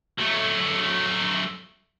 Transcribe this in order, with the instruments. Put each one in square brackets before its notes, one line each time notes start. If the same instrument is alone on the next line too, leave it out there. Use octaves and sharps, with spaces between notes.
[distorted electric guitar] F#3 A3